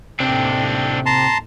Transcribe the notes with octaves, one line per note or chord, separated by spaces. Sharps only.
D#2 A2 C3 C4 D4
A5 A#5 C6